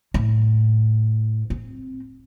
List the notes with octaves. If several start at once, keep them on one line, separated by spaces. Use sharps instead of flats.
A2
C4